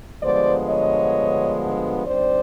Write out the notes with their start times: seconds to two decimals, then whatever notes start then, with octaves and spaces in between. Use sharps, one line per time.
0.22 G2 D3 F3 G#3 B3 C5 D5
0.68 C#5 D#5
2.06 D3 G3 C4 D#4 C5 D5